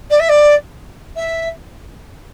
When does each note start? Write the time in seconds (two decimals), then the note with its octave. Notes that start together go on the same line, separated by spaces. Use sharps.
0.10 D5
0.20 E5
0.29 D5
1.16 E5